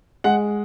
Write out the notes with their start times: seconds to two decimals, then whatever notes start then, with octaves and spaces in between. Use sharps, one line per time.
0.24 G#3 F#5